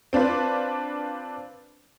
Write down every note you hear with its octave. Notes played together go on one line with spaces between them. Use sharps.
C4 D4 F4 B4